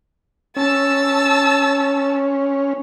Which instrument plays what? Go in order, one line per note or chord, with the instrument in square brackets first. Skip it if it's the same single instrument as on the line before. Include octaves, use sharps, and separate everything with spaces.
[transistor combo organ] C#4 [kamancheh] A5 E6